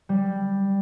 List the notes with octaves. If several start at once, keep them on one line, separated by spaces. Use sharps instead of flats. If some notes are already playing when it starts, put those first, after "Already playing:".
G3